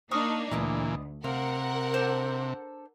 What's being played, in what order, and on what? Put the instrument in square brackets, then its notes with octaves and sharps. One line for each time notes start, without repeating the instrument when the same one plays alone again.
[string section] A#3 D4 D#4 [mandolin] C#6 D#6 F6
[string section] D2 [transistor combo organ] A#2 E3 [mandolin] B3 D#5 D6
[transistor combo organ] C3 [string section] A#4 F#5 [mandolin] F5
[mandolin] D4 A4 C5